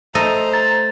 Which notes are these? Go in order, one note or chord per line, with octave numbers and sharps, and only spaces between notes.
A3 A4 C5 D#5 A#5
A6